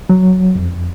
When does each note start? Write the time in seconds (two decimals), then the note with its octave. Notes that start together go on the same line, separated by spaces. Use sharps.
0.09 F#3
0.55 F2